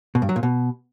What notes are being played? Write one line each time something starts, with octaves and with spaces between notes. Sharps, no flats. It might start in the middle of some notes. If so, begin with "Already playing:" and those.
B2
G2
F#3
A#2
B2